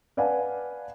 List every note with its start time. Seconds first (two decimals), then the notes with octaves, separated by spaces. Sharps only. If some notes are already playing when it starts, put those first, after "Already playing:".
0.17 B4 D5 F5 F#5 G#5 A5